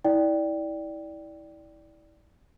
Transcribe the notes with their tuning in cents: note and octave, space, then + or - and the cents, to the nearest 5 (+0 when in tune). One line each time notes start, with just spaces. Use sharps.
E4 -25 D5 +0 G5 +0